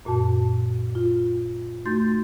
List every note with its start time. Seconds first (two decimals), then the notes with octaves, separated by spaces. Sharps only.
0.05 F#2 A#2 F#4 A5
0.95 F4
1.85 A3 D#4 F#4 C6 G6 A6